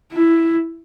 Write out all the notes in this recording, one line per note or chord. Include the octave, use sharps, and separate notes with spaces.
E4